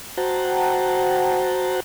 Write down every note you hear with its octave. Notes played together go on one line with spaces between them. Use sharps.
F#4 C5 F#5 G5 A5 A#5